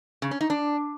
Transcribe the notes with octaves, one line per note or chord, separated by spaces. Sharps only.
C#3
C#4
D#4
D4